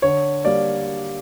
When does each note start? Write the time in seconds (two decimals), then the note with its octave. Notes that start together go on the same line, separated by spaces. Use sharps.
0.02 D3 C#5
0.45 G3 A#3 D5